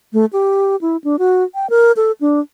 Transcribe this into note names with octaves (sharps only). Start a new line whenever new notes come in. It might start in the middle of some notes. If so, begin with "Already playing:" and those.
A3
G4
E4
D4
F#4
G5
A#4
A4
D4